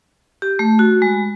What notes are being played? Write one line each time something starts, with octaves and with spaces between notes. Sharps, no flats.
G4
A3
F#4
G#3